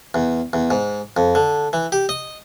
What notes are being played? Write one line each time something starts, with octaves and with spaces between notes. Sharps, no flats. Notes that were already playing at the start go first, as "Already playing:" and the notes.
E2
E2
G#2
F2
D3
E3
G4
D#5